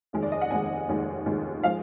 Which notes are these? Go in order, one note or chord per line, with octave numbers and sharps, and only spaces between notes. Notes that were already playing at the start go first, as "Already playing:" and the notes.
F1 D#2 D#3 G#3
D5
D#5
F#5
F1 D#2 D#3 G#3 G#5
F1 D#2 D#3 G#3
F1 D#2 D#3 G#3
F3 G#3 F5